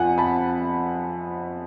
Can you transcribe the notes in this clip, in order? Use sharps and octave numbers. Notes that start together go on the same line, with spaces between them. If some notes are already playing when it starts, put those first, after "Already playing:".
Already playing: F2 F3 F#5 G#5
A5 B5